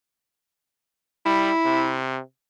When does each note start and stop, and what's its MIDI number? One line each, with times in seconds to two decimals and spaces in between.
1.26 1.51 55
1.26 1.99 64
1.65 2.20 48